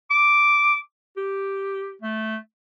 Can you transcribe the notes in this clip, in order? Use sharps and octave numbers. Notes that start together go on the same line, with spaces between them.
D6
G4
A3